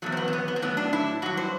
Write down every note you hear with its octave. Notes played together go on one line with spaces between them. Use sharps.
E2 B2 F#3 A3
C4
B3
C4
B3
B3
C4
A2 F#3 B3
D4
E4
G2 F#3 F#4
C5